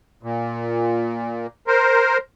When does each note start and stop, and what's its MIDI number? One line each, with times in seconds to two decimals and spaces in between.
0.23 1.47 46
1.67 2.18 70
1.67 2.18 72